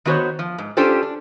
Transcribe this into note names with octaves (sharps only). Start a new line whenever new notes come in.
D#3 B3 F#4 G4 C5 C#5
F3
G#2
C#4 D4 F4 G4 A4 C5
D4